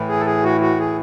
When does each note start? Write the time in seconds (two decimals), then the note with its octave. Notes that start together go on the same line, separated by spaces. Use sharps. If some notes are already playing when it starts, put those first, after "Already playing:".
Already playing: A2 E3
0.09 G#4
0.20 A4
0.26 G#4
0.44 F#4
0.61 F#4
0.79 G#4